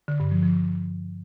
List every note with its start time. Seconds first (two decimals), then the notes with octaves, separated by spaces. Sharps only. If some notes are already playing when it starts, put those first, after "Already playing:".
0.08 D3
0.20 G2
0.31 F3
0.43 F3